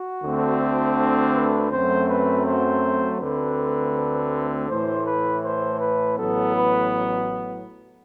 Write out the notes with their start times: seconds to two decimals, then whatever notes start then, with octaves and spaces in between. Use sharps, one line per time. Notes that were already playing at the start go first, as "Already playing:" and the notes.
Already playing: F#4
0.22 D2 D3 A3 C4
0.97 A4
1.33 B4
1.71 F#2 F#3 A3 C4 C5
2.08 B4
2.45 C5
3.19 D2 D3 A3 C4 B4
4.68 A2 E3 A3 C5
5.04 B4
5.43 C5
5.79 B4
6.17 A1 A2 F#3 B3 A4
6.54 B4